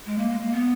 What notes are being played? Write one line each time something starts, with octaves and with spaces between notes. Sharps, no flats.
G#3
A#3
G#3
A#3
B3